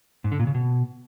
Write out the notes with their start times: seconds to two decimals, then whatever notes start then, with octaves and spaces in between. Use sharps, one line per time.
0.24 G#2
0.32 D3
0.39 A#2
0.47 C#3
0.54 B2